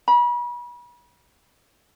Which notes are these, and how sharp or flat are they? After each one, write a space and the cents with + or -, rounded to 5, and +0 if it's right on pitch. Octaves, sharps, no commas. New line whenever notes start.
B5 -35